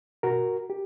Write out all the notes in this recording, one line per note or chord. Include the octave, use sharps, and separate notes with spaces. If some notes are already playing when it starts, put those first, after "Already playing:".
B2 F#4 A#4
G4